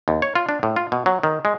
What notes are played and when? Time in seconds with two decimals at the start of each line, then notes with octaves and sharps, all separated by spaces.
0.08 D#2
0.22 C#5
0.35 F4
0.49 D4
0.63 A2
0.76 F4
0.92 B2
1.06 F#3
1.23 D#3
1.45 G#3